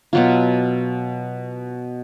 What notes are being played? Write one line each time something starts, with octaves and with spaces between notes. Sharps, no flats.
B2 F#3 F4